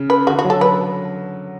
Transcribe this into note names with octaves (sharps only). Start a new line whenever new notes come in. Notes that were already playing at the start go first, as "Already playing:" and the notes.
Already playing: C#3
B4
D3 F#4
F#4
F#3
A4
B4